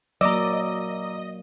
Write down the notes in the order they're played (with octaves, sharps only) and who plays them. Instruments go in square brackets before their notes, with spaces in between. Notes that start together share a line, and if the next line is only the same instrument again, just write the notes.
[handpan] F#3 A#3 [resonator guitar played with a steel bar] D5 [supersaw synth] D#5 [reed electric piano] A#5 D6 E6